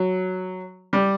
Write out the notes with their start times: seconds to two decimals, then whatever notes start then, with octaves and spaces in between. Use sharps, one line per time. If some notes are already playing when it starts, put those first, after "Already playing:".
Already playing: F#3
0.93 G3